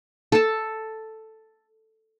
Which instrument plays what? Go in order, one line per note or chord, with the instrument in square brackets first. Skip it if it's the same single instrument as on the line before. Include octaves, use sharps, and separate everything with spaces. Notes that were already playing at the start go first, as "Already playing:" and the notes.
[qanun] A4 A5